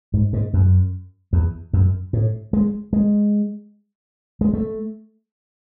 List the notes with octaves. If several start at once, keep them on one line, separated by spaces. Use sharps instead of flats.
G#2
G#2
F#2
E2
F#2
A2
G#3
G#3
G#3
A3